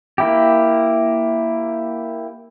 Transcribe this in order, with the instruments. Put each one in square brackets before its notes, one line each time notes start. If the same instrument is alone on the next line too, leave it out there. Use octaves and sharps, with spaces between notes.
[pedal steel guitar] A#3 E4 G4